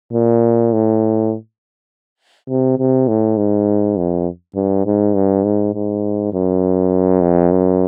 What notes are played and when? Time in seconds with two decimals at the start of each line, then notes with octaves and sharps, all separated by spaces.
0.13 A#2
0.72 A2
2.49 C3
2.78 C3
3.08 A2
3.37 G#2
3.97 F2
4.55 G2
4.86 G#2
5.15 G2
5.44 G#2
5.74 G#2
6.33 F#2
7.21 F2
7.51 F#2